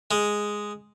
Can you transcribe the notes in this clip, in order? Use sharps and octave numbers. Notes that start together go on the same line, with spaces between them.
G#3